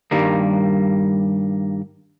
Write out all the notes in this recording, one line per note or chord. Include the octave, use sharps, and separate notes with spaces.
G2 D#3 G3 A#3